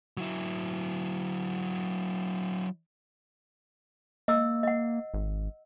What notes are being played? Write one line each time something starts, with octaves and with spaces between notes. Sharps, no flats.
F#3 E4
A#3 D#5 E6
D#5 F#5
G#1